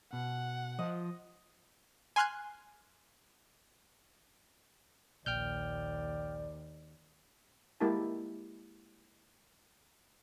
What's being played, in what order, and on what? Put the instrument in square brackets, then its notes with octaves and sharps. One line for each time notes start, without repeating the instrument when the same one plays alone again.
[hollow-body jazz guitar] B2 [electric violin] F#5
[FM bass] F3 [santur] D#5
[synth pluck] G#5 C6 F6 F#6 G#6
[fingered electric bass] A#1 [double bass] D#2 [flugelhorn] D5 [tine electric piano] G5 F6 G6
[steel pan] G#3 A#3 E4 G4 A#4 A5